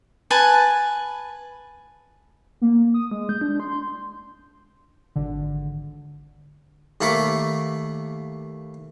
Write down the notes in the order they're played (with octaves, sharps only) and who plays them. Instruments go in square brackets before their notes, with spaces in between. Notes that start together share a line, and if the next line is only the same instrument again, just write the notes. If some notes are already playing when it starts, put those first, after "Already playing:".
[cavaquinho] B4 G#5 A5
[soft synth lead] A#3
D#6
G#3
G6
D4
C6
[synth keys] G#1 D3
[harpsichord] D#2 A3 A#3 B5 C#6 D6